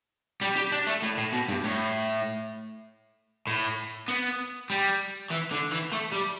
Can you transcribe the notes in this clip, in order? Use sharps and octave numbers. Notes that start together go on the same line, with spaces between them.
G3
G4
D4
A3
A2
A2
B2
G2
A2
A2
B3
G3
E3
D3
E3
A3
G3